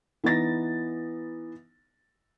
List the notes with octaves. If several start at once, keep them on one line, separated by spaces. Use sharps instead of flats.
E3 B3 D#4 A6 A#6